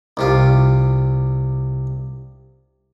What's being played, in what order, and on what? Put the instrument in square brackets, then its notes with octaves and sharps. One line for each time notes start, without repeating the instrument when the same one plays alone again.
[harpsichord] C2 C3 F4